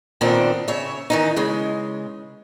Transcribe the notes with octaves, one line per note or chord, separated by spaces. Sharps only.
A#2 D3 D#3 B3 C4 D4
C#3 C#5 E5
D#3 E3 D#4
C#3 G#3